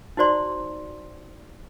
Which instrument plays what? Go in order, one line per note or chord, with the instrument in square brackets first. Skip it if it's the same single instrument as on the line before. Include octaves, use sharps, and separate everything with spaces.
[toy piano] D#4 E4 F#4 C5 D5 C6